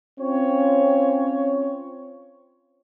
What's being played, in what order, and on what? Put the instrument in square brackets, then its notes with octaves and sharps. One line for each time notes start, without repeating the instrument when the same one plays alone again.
[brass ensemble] C4 C#4 F4 C#5